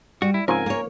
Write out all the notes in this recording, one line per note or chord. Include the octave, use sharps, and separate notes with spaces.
G3 F#4
E4
G#2 C#3 F3 C4 A#4 G#5
A#3 C#5